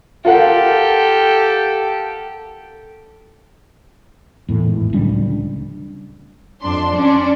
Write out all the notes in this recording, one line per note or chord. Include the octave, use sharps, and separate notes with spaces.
F4 G4 A4 A#4 F#5
E2 A2
G#1
D1 C#2 G3 D4
F2 D4 C6
C#4 D4